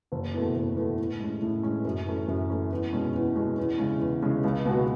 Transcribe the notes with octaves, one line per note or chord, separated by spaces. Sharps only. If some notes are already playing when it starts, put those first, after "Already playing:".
F#1
E2 B2 A3
F#1
E2 B2 A3
A2
G#3 C#4
A2
G#3 C#4
F#2
E3 A3 C#4
F#2
E3 A3 C#4
E2
B2 G#3 C#4
E2
B2 G#3 C#4
E2
C#3 G#3 C#4
E2
C#3 G#3 C#4
C#2
B2 G#3 B3 F#4